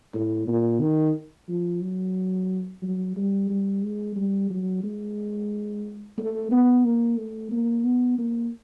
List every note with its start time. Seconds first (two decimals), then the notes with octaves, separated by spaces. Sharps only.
0.14 A2
0.47 A#2
0.81 D#3
1.48 F3
1.82 F#3
2.82 F#3
3.16 G3
3.50 G3
3.82 G#3
4.16 G3
4.50 F#3
4.83 G#3
6.18 A3
6.51 B3
6.85 A#3
7.17 A3
7.51 A#3
7.84 B3
8.18 A#3